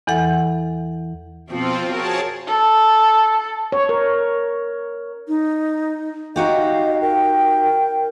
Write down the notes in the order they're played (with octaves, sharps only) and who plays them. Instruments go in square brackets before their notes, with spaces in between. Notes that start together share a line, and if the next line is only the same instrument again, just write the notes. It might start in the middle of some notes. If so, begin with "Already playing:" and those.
[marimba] E2 E3 A4 F#5
[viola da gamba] F2 B2 F3 [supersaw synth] C4 F4
[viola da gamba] F#4 A#4 [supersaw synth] G#4 C#5 A5
[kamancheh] A4
[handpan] C#5
A#4
[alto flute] D#4
[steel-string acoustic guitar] D#4 F#4 G4 [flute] D#5 [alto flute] F5
[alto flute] A#4 [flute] G5